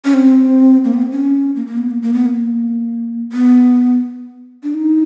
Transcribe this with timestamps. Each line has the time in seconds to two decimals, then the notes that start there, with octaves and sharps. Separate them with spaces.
0.05 C#4
0.14 C4
0.84 A#3
0.93 B3
1.02 C4
1.11 C#4
1.56 A#3
1.67 A#3
1.78 B3
1.91 A#3
2.02 A#3
2.14 B3
2.26 A#3
3.32 B3
4.63 D4
4.74 D#4